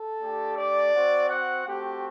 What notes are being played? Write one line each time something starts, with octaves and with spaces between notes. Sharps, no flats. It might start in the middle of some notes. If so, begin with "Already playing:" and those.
Already playing: A4
A3 D4 G4
D5
C4 F#4
F#5
A3 C4 F#4 G4